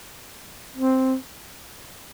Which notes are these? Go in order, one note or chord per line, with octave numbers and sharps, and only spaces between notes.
C4